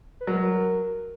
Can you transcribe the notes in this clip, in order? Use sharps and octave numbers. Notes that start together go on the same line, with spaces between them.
B4
F#3 A#4